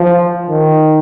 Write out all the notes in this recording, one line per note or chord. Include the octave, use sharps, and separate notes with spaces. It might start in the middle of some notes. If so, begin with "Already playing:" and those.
Already playing: F3
D#3